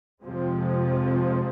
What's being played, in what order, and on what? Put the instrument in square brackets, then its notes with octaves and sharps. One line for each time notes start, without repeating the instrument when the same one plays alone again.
[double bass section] F2 C3 F3 G#3 C4